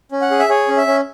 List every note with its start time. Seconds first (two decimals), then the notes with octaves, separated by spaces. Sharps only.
0.12 C#4
0.21 F#5
0.31 G#4
0.39 E5
0.49 G#4 C#5
0.68 C#4
0.77 E5
0.87 C#4